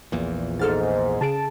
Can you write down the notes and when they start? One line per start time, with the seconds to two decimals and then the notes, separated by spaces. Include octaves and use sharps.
0.12 A#1 E2 A#2
0.59 G#2 A4 F6 A6
1.21 C#3 G#4 A5 D7